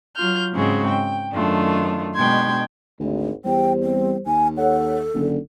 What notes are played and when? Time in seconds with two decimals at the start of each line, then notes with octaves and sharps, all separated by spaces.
0.16 F#3 F4 F6 G6
0.53 G#2 C#3 G#3 C4 F#4 G#4
0.86 G5
1.32 F#2 D#3 A3 D4 F4
2.15 B2 G#3 D4 G5 C6 G#6
3.00 G#1 D2
3.45 E2 G3 C5 G5
3.83 C4
4.26 D#2 G#5
4.57 A4 C#5 F#5
5.14 F#1 D3